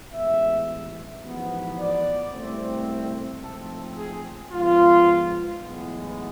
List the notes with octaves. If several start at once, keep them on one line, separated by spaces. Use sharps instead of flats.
A1 G#2 G#3 B3 E5
A1 G#2 F3 B3
D5
C2 B2 A3 C4
G#2 F3 A3 C4 A4
G#4
G#2 F3 B3 F4
B1 A2 E3 G#3 B3